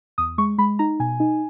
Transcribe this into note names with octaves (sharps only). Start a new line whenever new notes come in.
E2 D#6
G#3 C#6
G#3 B5
D#4 A#5
B2 G#5
D#4